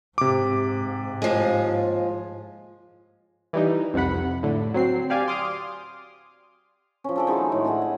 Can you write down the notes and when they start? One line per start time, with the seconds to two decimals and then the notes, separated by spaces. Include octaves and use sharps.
0.18 G#2 C3 D6
1.22 D#2 F3 G#3
3.53 E3 G3 D#4
3.94 C2 F2 C3 F#5 B5
4.43 A2 D3
4.74 F#3 C4 C7
5.10 G4 D5 F5 G#5
5.28 C6 D6 D#6 F6
7.04 F3 C#4
7.16 D4 A4 D5
7.27 D#3 G#3 E4 F#4
7.52 A2
7.65 D4 F#4 G#4 F#5
7.82 E5